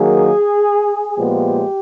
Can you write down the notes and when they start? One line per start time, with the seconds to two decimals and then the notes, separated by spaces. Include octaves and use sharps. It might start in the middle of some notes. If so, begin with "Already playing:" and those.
Already playing: D#3 F#3 A#3 G#4
1.17 A#2 F3 G#3 B3 G4